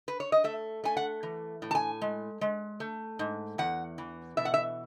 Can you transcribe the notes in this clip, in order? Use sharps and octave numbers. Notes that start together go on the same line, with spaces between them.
B4
C#5
D#5
A3 E5
A3 G#5
F#5
E3
A2
A5
G#5
G#3
G#3
A3
G#2
E2 F#5
E3
B2 E5
F#5
E5